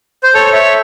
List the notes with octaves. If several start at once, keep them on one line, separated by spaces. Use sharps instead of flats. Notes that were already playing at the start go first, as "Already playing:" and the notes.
C5
A4 C#5
C#5 E5